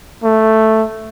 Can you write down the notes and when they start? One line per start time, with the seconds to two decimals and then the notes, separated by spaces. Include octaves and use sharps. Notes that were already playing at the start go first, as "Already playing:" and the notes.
0.24 A3